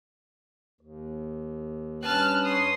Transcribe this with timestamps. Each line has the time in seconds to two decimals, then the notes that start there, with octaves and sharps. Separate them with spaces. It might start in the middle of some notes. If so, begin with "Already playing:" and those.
0.81 D#2
2.03 G2 C#4 B4 A5 F6 F#6
2.45 C#5 C6 D#6